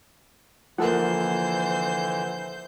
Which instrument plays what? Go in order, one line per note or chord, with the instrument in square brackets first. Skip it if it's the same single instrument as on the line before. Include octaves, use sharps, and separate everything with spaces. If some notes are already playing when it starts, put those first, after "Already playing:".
[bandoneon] D3 E3 [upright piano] F3 A#3 [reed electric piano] A4 F#5 [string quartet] C5 G6